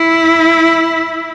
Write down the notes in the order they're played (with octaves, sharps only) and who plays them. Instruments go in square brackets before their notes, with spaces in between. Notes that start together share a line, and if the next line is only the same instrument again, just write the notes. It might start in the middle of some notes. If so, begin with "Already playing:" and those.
Already playing: [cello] E4